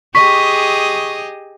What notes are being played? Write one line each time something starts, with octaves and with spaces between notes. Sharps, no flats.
G4 G#4 D#5 C#6 B6